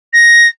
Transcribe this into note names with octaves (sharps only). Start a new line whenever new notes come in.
A#6